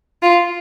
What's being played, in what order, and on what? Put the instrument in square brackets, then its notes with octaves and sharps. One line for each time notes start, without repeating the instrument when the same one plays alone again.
[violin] F4